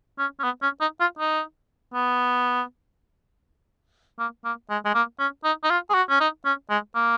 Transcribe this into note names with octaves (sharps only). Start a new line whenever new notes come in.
C#4
C#4
B3
C#4
D#4
F4
D#4
B3
A#3
A#3
G#3
G#3
A#3
C#4
D#4
D#4
F4
G#4
F#4
C#4
D#4
C#4
G#3
A#3